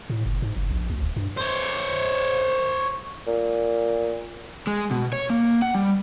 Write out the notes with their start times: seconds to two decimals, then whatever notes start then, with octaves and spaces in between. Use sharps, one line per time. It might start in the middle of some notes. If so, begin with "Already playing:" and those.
0.10 A2
0.25 F#1
0.42 G#2
0.57 F#1
0.71 A#1
0.90 D2
1.03 D#1
1.16 G2
1.37 C5 C#5
3.27 A#2
4.67 G#3
4.91 B2
5.13 C#5
5.30 A#3
5.62 F#5
5.75 G3